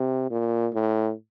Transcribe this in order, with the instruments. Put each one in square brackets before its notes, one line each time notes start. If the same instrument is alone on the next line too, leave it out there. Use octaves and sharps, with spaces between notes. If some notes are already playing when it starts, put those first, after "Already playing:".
Already playing: [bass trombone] C3
A#2
A2